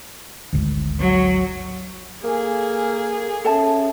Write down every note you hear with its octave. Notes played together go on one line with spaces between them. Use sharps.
G#1 D2
F#3
A#3 G#4 A4 F5 G#5
C#4 A4 C#5 E5 A5